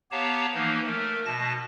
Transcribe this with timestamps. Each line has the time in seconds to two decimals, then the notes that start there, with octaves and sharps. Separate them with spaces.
0.11 B3 G4 C#5 F5 A5 A#5
0.54 E3 F3 A#3 D#4
0.86 A3 A#4
1.26 B2 A5 A#6